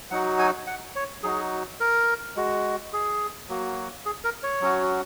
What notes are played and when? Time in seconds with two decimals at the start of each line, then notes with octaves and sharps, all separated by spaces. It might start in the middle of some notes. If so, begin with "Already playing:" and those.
0.11 F#3 D#4 F#4 F#5
0.39 G#5
0.67 F#5
0.96 C#5
1.23 F#3 D#4 F#4 G#4
1.80 A#4
2.36 G#3 F#4
2.93 G#4
3.49 F#3 A#3 F#4
4.06 G#4
4.24 A#4
4.43 C#5
4.61 F#3 C#4 F#4